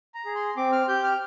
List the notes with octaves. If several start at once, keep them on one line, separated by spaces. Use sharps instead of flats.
A#5
G#4
C6
C4 D6
F6
G4 G6
F6